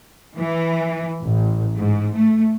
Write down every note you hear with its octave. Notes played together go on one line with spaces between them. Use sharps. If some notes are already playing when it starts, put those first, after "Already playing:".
E3
A1
G#2
A3